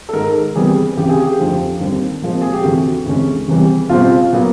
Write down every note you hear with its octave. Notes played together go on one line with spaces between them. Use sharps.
A4
G#2 D#3 G#3 A#4
C3 E3 G3 B3 D4 G#4
C#2 C3 E3 G4
G#4
G4
F2 D3 F3 A3 C4
D#2 D3 G3 C4
A#2 F3 G#3 C4
G#4
G4
D2 C3 E3 A3 F#4
D2 C3 E3 G#3 C#4
E2 C3 E3 G3
C#2 B2 G3 C4 F4
A#2 F#3 B3